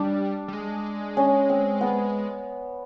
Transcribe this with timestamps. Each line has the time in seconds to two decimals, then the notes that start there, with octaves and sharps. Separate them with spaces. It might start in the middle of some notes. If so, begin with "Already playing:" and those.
Already playing: G3 D4
0.48 G3
0.53 G#3
1.17 C#4
1.50 C4
1.81 B3